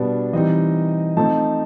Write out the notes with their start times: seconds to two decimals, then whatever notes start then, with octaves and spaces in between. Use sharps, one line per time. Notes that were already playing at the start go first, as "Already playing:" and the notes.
Already playing: B2 G3 B3 D4 D5
0.33 E3 G3 C4 D#4 D#5
1.17 F3 A3 C4 D#4 A5